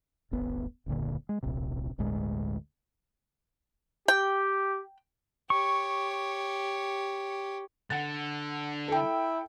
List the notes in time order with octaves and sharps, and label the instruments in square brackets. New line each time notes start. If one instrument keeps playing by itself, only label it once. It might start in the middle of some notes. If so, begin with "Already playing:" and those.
[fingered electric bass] D1 G1 B3
E1 C#2 A#2 D3
G#3
D1 A#1 C3
G1 D2 A2 G#3
[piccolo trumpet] G4 [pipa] G5
[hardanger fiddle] G4 C#5 [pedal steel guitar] C#6
[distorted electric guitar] D3 [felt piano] F#5 A6
[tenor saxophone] E4 [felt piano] A4 G5